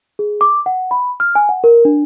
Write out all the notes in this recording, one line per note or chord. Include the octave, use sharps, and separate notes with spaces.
G#4
D6
F#5
B5
F6
G#5
F#5
A#4
D4